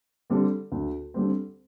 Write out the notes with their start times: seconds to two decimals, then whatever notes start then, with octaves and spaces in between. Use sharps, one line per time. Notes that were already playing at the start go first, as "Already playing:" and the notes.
0.30 D3 G3 C4
0.72 D2
1.14 D3 G3 C4